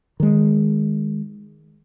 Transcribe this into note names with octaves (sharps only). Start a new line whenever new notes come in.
D#3 G#3